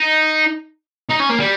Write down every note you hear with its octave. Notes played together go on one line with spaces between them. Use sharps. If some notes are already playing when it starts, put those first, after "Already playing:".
Already playing: D#4
D#4
C#4
A#3
G3